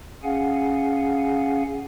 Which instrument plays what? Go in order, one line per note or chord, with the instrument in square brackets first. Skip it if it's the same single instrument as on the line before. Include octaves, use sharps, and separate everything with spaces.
[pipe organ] C#4 G#4 F5 F#5 G#5